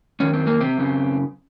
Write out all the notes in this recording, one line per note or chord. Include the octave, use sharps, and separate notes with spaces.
F#2 D#3 C#4
C4
A#3
C3 C4
F#2 C#3